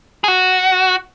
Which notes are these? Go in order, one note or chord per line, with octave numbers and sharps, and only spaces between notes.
G#4
F#4